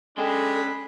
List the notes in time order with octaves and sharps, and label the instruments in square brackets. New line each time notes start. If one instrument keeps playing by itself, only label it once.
[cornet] G#3 [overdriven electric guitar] C#4 G5 [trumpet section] D4 B5 [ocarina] A4